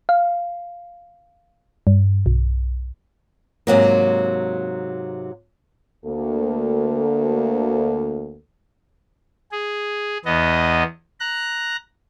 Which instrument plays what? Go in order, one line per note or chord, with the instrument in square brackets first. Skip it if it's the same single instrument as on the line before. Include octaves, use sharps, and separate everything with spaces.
[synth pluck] F5
G2
B1
[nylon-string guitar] G#2 C3 F#3 A#3
[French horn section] D2 A#3 A4
[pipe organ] G#4
E2 B3 D#5
A#5 F#6